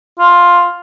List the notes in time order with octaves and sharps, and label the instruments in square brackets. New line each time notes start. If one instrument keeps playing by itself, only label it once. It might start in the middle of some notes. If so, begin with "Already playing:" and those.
[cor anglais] F4